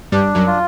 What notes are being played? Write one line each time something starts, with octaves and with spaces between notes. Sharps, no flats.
G2 G3 D4
F#2 F#3
F4